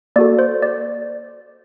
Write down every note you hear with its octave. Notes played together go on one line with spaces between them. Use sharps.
A#3 F#4 A4 D5
C5
D5